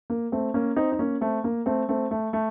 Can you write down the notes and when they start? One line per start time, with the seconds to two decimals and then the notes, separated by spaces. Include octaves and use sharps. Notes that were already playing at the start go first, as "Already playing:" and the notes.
0.10 A#3
0.32 A3 C4
0.54 A#3 C#4
0.76 C4 D#4
0.92 D#4
0.99 A#3 C#4
1.21 A3 C4
1.44 A#3
1.66 A3 C4
1.89 A3 C4
2.11 A3
2.33 A3